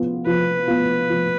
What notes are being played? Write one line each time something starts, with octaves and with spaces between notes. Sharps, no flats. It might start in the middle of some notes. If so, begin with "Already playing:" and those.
Already playing: F3 B3 F4
F3 B4
B3 F4
F3